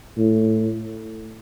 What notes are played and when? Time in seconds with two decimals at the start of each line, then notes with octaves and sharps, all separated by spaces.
0.18 A2